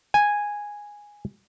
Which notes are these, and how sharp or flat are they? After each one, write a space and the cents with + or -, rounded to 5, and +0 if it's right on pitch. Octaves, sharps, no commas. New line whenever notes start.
G#5 -5